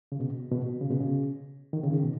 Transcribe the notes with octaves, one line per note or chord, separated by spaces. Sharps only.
C#3
B2
B2
C#3
B2
C#3
D#3
C#3
D#3
B2